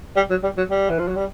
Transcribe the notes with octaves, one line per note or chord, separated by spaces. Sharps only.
G3
F#3
G3
F#3
G3
E3
F3
F#3
G3